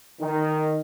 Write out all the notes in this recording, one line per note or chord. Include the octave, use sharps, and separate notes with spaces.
D#3